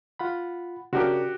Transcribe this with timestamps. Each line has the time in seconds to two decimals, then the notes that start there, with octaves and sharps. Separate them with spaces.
0.19 F4 F#5 B5
0.93 C#3 D4 F#4 G4 A#4